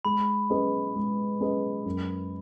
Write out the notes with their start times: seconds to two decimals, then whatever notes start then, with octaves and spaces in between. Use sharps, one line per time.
0.05 G#3 B5
0.50 C#4 G#4 B4 D#5
0.96 G#3
1.40 C#4 G#4 B4 D#5
1.86 F#2